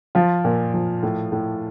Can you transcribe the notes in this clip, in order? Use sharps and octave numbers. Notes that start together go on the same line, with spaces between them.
F3 F4
A#2
F3
A2
A2